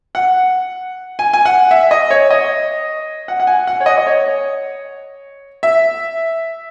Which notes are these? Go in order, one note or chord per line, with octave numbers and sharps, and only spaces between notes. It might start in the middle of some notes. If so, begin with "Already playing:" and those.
F#5
G#5
G#5
F#5
E5
D#5
C#5
D#5
F#5
F#5
G#5
F#5
C#5
D#5
D#5
C#5
E5